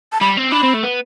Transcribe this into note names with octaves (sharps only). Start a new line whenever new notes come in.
A5
G3 B5
C4
D4 B5
C4
A3
B3